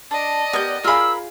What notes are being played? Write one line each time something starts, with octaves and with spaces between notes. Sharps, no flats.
D4 D5 D#5
B3 G4 A#4 G6
F4 G#4 A#4 F5 B5 E6